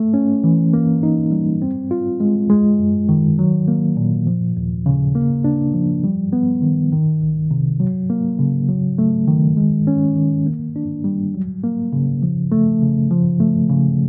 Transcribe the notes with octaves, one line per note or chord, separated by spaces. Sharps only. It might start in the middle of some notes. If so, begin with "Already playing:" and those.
Already playing: A3
C#4
E3
A#3
D#4
G3
C4
F4
G#3
G#3
F#2
D#3
F#3
A#3
A#2
F3
D#2
C#3
A#3
D4
F3
G3
B3
D#3
D#3
C2
C3
F#3
A#3
C#3
F#3
A3
D#3
G#3
C#4
D#3
A#3
D4
G3
F#3
A#3
C#3
F3
A3
C#3
F3
A3
C#3